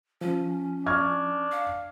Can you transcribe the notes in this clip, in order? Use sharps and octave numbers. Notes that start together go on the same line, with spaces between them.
F3 C#4
D4 C#6 F6 G#6
F5